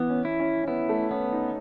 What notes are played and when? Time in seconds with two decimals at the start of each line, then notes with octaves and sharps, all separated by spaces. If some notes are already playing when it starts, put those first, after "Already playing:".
Already playing: E3 B3
0.10 C#4
0.25 E4
0.40 C#4
0.63 C#4
0.68 B3 E4
0.89 A3
1.11 B3 C#4
1.32 D#4